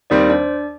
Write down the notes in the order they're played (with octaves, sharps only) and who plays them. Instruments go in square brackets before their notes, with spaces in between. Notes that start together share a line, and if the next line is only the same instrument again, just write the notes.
[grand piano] D#2 D#3 G3 C4 [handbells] D5
[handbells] C5
D4 D5